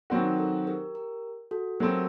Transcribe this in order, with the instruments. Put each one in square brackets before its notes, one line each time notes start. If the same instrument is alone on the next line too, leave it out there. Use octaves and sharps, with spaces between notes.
[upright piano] D#3 F#3 C4 F#4 [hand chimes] A#4 D5
[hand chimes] A4 C5
G4 A#4
G4 A#4
F#4 A4
[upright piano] F#3 A3 C4 [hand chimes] G4 A#4